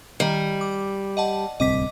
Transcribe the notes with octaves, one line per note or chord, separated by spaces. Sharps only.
D#3 G3 D#5
D6
D#5 F#5 A5
D1 C2 C4 D#5 D6 B6